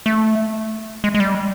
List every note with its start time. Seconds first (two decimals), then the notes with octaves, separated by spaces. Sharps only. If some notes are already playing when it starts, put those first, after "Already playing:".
0.06 A3
1.04 G#3
1.15 G#3
1.20 G3